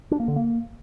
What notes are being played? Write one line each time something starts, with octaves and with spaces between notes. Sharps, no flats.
D4
A#3
D3
A#3